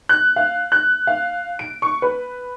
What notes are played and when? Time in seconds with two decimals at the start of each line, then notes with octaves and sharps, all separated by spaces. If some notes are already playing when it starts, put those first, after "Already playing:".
0.09 F#6
0.36 F5
0.72 F#6
1.07 F5
1.59 D7
1.82 C#6
2.02 B4